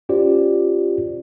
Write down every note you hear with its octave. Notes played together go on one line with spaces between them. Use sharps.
C#4 F4 G4 C5 D5